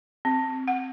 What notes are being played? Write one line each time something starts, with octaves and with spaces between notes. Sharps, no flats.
C4
F#5